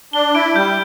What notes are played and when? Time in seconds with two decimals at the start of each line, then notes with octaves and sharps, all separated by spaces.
0.13 D4 G7
0.35 E4 D7
0.55 G3 G6